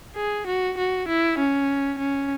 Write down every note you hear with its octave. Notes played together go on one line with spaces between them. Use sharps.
G#4
F#4
F#4
E4
C#4
C#4